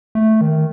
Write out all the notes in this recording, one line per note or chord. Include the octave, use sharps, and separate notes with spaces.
A3
D#3